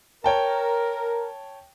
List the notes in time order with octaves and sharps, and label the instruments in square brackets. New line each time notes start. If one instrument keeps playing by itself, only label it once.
[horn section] A#4 [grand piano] C#5 G5 A5